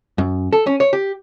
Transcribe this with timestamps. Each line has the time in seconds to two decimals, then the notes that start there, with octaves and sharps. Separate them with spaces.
0.18 F#2
0.52 A4
0.67 C#4
0.80 C#5
0.93 G4